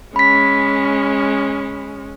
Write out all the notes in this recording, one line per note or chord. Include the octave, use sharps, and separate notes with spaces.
G#3 C#4 B5 B6